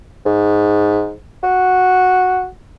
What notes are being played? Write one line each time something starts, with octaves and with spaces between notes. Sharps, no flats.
G#2
F#4